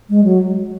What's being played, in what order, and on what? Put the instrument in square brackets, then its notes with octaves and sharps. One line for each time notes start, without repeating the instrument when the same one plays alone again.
[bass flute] G#3
F#3